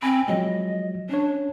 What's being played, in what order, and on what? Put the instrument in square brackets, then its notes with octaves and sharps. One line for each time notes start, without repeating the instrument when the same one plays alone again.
[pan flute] C4 [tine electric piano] G#5 B5
[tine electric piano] F3 F#3 G#3 [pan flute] D#5
[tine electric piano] C#4 C#5 [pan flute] D4